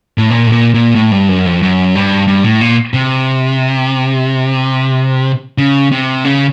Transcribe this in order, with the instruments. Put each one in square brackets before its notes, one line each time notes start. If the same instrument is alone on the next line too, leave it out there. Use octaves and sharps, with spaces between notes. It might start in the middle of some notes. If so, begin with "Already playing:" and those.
[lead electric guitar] A2
A#2
A2
A#2
A#2
A2
G2
F#2
F2
F#2
G2
G2
A2
A#2
C3
C#3
C3
C#3